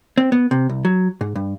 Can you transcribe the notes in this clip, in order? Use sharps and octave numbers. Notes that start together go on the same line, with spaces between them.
C4
B3
C3
C2
F#3
G#2
G2